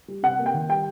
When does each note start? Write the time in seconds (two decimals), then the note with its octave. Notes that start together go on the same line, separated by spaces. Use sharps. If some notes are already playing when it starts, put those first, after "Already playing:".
0.08 G3
0.23 C3 F#5
0.39 A#3
0.46 G5
0.54 D#3
0.69 G3 G5